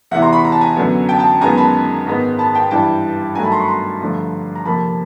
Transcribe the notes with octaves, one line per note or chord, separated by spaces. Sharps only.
E2 C3 E3 E5 F#5
A#5 C6
B5 C#6
A#5
A5
G#5 A#5
F#2 D3 F#3 B3
G5 A5
G5 A5
F#2 D#3 G#3 B3 G#5 A#5
A5 B5
G#2 D#3 G#3 B3
A5 B5
G5 A5
G2 E3 G3 G5 A5
G2 D#3 F#3 A3 G#5 A#5
A5 B5
A#5 C6
B5 C#6
A#5 C6
G2 D3 F3 A3
A#5
F2 C3 F3 A#3 A5 B5